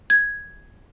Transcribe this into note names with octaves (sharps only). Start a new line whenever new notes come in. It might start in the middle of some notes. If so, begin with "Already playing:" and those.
G#6